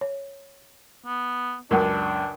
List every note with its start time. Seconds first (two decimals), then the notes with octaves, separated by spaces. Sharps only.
0.01 C#5
1.06 B3
1.71 C#2 F#2 D4 A#4